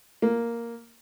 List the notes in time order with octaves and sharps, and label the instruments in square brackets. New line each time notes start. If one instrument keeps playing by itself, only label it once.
[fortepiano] A#3